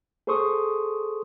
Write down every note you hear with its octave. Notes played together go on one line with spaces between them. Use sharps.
G#4 A4 C5 C6 C#6 D#6